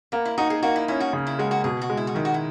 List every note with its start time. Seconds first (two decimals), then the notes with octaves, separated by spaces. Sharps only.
0.12 A#3 B3
0.25 E4
0.38 D#4 F#4
0.50 G#4
0.62 A#3 F#4
0.76 E4
0.88 C#4 E4
1.00 F#4
1.13 C#3
1.27 E4
1.39 G#3 F#4
1.51 F#4
1.64 B2 G#4
1.81 F#4
1.90 G#3
1.97 E4
2.07 F#4
2.15 D#3 E4
2.25 F#4
2.34 E4